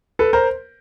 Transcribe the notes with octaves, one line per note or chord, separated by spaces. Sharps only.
A4 B4
A#4 C5